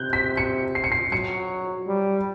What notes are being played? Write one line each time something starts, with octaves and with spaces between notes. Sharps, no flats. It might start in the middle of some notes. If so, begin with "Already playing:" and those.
Already playing: C3 F#6 G6
B6
C#7
C7
C#7
C7
F#3 C#7
G3